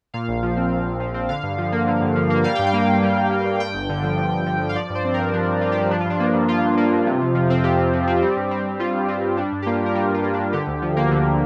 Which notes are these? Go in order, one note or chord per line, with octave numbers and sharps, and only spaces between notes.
A#2 F5
A#1
F3
C4
A#2
A#1
F3
C4
D3 F5
G2
F3
A#3
D3
G2
F3
A#3
G3 F5
G2 G5
F5
A#3
G2
G3
G2
A#3
G2
G2 G5
G1
D3
F3
G2
G1
D3
F3
F5
F3 D5
G2
C5
C4
G2 A#4
F3 D4
G2
C4 F4
G2 G4
F3 D4
F4
G2 D4
A#3
G2
F3 F4
G2
A#3
G2
C3
F2
F3
C4
C3 G4
F2
F3
C4
G3
G2
C4
G2
G3 F4
G2
C4 F4
G2
G3 D4
G2
G4
A#3 F4
G2 A#4
G3 G4
G2 F4
A#3
G2 D4
D3 G4
D2
F3
A#3
D3